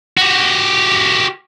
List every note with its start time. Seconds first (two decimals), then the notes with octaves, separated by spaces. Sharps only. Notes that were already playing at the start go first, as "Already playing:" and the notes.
0.17 F#4 G4